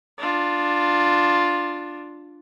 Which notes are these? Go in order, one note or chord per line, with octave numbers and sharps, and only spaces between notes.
D4 F4